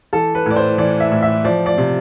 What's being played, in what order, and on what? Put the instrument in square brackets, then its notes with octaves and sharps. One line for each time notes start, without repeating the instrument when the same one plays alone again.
[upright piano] E3 A4
B4
A2 D5
C5
E3 D5
E5
A2
E5
F3 D5
D5
C3